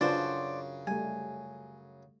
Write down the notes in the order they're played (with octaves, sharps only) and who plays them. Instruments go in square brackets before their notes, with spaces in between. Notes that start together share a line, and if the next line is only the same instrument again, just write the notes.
[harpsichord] F#2 C#3 [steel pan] D4 F4 B4 [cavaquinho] F#4 C5 D5
[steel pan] G3 A3 [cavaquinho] G#5